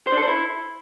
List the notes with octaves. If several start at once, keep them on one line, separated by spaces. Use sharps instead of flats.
C5
D4
A4
C5
E4